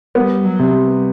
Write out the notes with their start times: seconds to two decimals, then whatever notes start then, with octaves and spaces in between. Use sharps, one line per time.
0.15 G3 B3
0.44 F#3
0.59 C3
0.74 G3